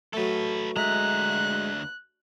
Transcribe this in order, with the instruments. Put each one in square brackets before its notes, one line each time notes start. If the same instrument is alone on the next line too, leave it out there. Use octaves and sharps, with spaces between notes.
[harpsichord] F#3 A3 [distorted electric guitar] A4 B4
[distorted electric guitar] D2 A#5 [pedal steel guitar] G#3 E5 [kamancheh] F#6